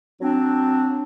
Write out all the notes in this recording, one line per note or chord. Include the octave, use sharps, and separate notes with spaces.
F#3 C4 D4